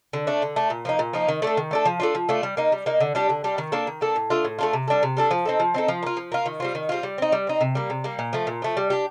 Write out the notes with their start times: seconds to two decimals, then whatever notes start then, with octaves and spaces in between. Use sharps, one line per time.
0.13 D3
0.27 A3 D4
0.42 D3
0.56 A3 D4
0.70 A#2
0.85 F3 A#3 D#4
0.99 A#2
1.13 F3 A#3 D#4
1.28 D#3
1.42 A3 D4 A4
1.57 D#3
1.71 A3 D4 A4
1.86 F3
2.00 A3 D4 F4
2.15 F3
2.29 A3 D4 F4
2.43 G3
2.57 A#3 D#4
2.72 G3
2.86 A#3 D#4
3.00 D3
3.15 G3 D4 G4
3.29 D3
3.44 G3 D4 G4
3.58 D#3
3.72 A#3 D4 A4
3.87 D#3
4.01 A#3 D4 A4
4.16 A2
4.30 A3 D4 F4
4.45 A2
4.59 A3 D4 F4
4.73 C3
4.88 G3 D4 A4
5.03 C3
5.17 G3 D4 A4
5.31 F3
5.45 C4 D#4 A4
5.60 F3
5.74 C4 D#4 A4
5.88 F3
6.03 A#3 F4
6.17 F3
6.32 A#3 F4
6.46 D#3
6.60 G3 C4 F4
6.75 D#3
6.89 G3 C4 F4
7.03 G3
7.18 C4 D#4
7.32 G3
7.47 C4 D#4
7.61 C3
7.75 G3 A#3
7.90 C3
8.04 G3 A#3
8.19 A#2
8.33 F3 A3
8.47 A#2
8.62 F3 A3
8.77 G3
8.90 D4 G4